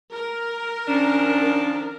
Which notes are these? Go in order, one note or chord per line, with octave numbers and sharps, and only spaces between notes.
A#4
D#3 F3 C#4 D4